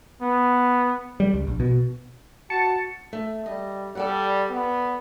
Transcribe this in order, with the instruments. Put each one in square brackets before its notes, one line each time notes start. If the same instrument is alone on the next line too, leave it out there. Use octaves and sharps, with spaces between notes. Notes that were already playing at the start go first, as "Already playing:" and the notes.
[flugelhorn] B3
[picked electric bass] G3
C#2
A#1
B2
[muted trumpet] F#4 [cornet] A5 [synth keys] C#7
[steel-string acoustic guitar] A3
[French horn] G3 [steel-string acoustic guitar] D#5
[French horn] G3 [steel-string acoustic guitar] A4 D5 F#5
[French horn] B3